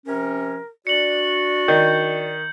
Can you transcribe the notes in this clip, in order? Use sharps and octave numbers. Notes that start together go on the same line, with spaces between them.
C3 F3 C#4 A#4
D4 F#4 D5 C#7 F#7
D#3 G6